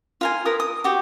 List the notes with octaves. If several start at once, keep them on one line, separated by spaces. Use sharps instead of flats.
F4 A#4 G#5
A#4 B4 D#6
D#6
F#4 G4